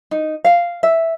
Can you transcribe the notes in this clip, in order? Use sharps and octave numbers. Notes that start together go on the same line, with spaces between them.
D#4
F5
E5